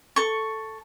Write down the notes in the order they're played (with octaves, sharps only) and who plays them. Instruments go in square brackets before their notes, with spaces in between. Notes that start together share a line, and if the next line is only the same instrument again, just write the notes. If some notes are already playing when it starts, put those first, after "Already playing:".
[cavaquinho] A4 C#6